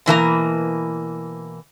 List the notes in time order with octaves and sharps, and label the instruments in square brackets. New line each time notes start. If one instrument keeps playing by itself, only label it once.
[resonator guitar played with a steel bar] B2 E3 A#3 A#5